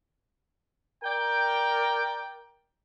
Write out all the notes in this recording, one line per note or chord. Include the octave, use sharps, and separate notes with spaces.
A#4 D5 G5